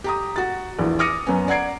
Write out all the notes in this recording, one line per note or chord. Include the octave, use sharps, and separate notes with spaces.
G4 A#5 D#6
F#4 A6
A#1 E2 A2
D6 D#6 F6 A#6 C#7 D#7
F#2 B3 C#4
D5 F#5 A#5 G#6 C7 D7